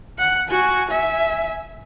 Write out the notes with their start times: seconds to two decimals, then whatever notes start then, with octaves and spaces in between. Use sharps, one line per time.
0.19 F#5
0.49 F#4 G#5
0.90 E5 G#5